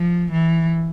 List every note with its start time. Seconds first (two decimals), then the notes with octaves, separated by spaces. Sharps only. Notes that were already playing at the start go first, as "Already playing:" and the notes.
Already playing: F3
0.32 E3